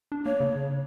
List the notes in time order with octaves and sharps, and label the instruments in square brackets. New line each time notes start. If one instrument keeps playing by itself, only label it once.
[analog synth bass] D4
[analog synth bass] A#3 [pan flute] C#5
[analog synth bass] C#3